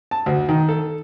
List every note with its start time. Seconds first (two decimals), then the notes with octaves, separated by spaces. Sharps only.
0.11 A5
0.26 D2
0.49 D#3
0.69 A4